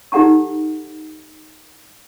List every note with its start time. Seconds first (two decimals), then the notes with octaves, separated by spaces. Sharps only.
0.12 D#4 G4 A4 F#5 A#5 C#6